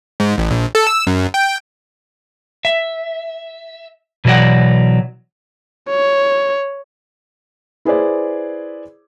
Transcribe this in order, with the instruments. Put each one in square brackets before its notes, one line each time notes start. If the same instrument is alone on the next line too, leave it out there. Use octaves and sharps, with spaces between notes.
[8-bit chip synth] G#2
A1
A#1
A4
E6
F#2
G5
[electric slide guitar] E5
B2 E3 F#3 D5 F#5
[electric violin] C#5
[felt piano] E4 G#4 B4 C5 D5